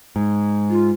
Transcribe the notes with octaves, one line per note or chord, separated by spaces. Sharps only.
G#2
F4